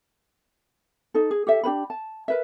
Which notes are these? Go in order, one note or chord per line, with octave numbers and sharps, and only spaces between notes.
D#4 A4
G#4
G4 A4 E5
D4 G4 B4 B5
A5
A#4 B4 E5